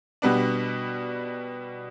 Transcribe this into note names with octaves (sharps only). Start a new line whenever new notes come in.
B2 G3 B3 D4